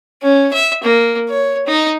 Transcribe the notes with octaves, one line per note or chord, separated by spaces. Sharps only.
C#4
E5
A#3
C#5
D#4